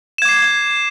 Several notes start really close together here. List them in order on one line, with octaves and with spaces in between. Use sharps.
E7 G#6 D6 C7